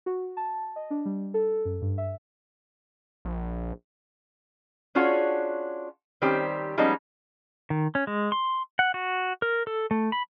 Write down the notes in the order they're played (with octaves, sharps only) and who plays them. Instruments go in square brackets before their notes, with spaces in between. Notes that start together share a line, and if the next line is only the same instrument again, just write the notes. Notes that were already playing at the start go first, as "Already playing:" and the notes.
[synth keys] F#4
A5
D#5
D4
G3
A4
F#2
G2
E5
[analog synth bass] A#1
[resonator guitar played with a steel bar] C#4 D4 F4 F#4 G#4 C#5
D#3 G3 C4 C#4 G4 C5
F3 G3 G#3 B3 C#4 D#4
[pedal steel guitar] D#3
C#4
G#3
C6
F#5
F#4
A#4
A4
A3
B5